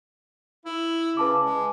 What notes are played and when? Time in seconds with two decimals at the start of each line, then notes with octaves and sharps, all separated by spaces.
0.66 E4
1.17 C#3 B4 A5 D6
1.44 G#3